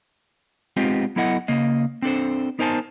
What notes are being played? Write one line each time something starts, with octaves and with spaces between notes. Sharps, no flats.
G#3 B3 C4 D#4 F4 G4
F#3 B3 E4 A4 D#5 F#5
C#3 A#3 D#5
C4 D4 A4 C5
B3 D#4 A#4 C5 G#5 A5